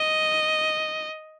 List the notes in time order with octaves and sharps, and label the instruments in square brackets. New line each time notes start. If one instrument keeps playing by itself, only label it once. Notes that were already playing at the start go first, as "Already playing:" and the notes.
Already playing: [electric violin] D#5